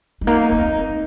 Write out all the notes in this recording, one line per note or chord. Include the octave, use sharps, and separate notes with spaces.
G#3
A#3 D#4
A#3
C4